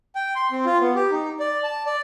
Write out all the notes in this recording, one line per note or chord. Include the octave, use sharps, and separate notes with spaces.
G5
C6
C4
F4
B3
G4
D#4
D5
A5
D5